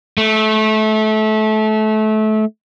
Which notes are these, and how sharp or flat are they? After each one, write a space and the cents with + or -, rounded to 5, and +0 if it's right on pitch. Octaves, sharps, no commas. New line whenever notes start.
A3 -25